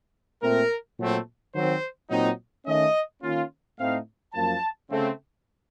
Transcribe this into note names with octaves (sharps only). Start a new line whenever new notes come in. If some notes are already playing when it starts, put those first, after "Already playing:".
A#2 A3 C4 A#4
A#2 F#3 A3 C4
D#3 F#3 C4 C5
A#2 F#3 C4 D#4
D#3 A3 C#4 D#5
D#3 A#3 C#4 F4
A2 A3 C4 D#4 F5
F#2 F3 A#3 A5
C#3 A3 C4